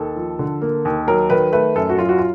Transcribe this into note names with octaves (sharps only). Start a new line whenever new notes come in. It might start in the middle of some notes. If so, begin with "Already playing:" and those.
Already playing: D#2 A4
F3
D3
A#3
D#2
F#3 A#4
D#3 B4
A3 B4
F#2 A4
F#4
F#3 F4
F#4
F4